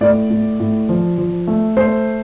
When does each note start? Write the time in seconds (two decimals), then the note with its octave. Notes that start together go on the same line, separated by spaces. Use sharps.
0.01 A2 D5
0.30 A2
0.60 A2
0.89 F3
1.18 F3
1.47 A3
1.77 A3 C5